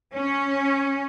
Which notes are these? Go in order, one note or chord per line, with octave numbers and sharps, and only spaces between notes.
C#4